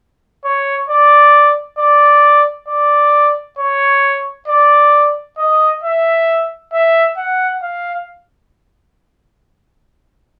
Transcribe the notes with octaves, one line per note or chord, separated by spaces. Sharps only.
C#5
D5
D5
D5
C#5
D5
D#5
E5
E5
F#5
F5